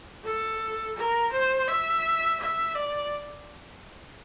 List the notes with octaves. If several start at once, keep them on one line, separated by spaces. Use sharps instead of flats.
A4
A#4
C5
E5
E5
D5